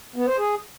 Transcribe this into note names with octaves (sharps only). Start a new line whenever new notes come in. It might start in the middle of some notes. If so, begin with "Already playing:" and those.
B3
C5
G#4